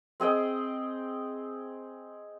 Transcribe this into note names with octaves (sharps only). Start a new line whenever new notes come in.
C4 G#4 D#5 G5